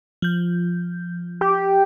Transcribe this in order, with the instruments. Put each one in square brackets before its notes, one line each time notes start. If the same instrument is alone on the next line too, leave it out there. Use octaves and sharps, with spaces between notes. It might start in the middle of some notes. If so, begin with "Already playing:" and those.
[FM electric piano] F3 G6
[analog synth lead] G4